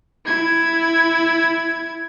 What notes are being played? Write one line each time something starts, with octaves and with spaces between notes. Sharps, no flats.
E4 G#6